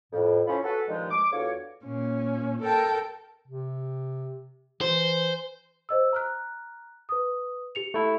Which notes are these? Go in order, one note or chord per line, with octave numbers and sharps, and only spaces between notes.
F2 A2
A2 F3 C#4 F4 C5 B5
F#4 A4 B4
G2 A#2 D#3 F3 G#3
D6
E2 D3 F4 F#4 C#5
A#2 C#4
A4 A#4 G5 A5
C3
E3 C5
C5 D#5 E6
A#5 F6 F#6
B4 D#6
G4 C#7 F7
A3 E4